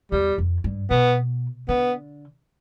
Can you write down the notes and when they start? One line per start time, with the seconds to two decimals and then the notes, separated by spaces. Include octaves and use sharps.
0.12 E2 G3
0.38 F2
0.64 G2
0.90 B2 B3
1.69 D3 B3